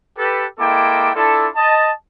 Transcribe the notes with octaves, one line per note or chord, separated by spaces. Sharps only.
G4 A4 B4
G#3 A#3 E4 A4 G5 D6
D4 E4 F4 A4
D#5 A5